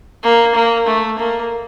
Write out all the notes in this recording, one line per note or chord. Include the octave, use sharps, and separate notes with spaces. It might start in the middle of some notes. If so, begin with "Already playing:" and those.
A#3
A#3
A3
A#3